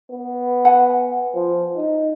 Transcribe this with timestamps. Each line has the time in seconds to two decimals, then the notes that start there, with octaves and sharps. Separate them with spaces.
0.10 B3
0.65 F#5 G#5
1.34 F3
1.76 D#4